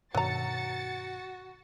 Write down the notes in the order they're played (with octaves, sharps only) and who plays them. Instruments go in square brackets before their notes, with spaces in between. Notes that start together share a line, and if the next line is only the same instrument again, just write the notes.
[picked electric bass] G2 B2 D#3 [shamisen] F#3 A#5 [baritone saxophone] F#4 [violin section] A6 C#7